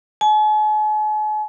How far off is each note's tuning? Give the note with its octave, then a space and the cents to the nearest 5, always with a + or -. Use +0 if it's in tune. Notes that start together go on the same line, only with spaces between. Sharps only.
G#5 +45